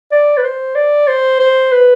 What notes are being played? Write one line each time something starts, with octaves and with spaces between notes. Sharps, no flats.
D5
B4
C5
D5
C5
C5
B4